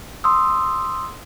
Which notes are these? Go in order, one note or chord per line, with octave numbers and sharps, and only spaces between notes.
C6 D#6 E6